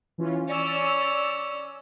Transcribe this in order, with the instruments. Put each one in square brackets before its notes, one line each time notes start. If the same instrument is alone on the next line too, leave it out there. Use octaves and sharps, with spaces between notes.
[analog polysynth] E3 C#4 F4
[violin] C#4 [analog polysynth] D5 E6